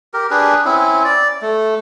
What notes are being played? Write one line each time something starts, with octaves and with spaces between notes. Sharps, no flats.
G4 A#4
D4 G4 G#4 B4
C4 C#4 E4
D5
A3